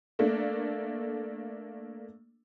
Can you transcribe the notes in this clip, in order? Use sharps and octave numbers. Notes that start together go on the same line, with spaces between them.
A3 A#3 D4